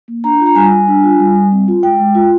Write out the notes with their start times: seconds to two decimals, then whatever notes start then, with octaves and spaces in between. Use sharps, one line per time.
0.08 A#3
0.24 D4 A#5
0.40 F4
0.46 A#5
0.55 G3 G#5
0.73 G3
0.88 D4
1.04 F4
1.20 G3
1.35 G3
1.52 C4
1.68 F4
1.83 G#3 G5
1.99 G#3
2.15 F4